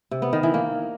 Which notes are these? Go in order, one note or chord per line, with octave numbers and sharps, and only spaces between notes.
C3
B3
D#3
E3
A#3